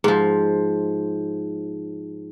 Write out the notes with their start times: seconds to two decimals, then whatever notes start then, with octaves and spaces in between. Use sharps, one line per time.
0.04 G#2 F3